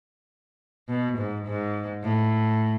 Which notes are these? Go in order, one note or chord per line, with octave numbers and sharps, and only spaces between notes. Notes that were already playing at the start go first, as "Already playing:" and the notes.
B2
G#2
G#2
A2